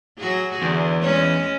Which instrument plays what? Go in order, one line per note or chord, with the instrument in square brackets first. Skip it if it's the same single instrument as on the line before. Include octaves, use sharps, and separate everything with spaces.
[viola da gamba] F#3 F#4 G#4
[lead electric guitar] E2 [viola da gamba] D3
[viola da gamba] G#3 C#4